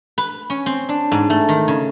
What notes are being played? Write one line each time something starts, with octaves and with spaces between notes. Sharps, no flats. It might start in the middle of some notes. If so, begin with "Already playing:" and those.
B4
C#4
C4
D4
G#2
A3
D#3
C#3